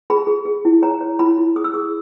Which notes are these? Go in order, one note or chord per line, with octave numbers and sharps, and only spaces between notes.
G#4 B5
G#4
G#4
E4
C#5 A#5
C#5
E4 B5
E4
G#4 D#6
E6
G#4 D#6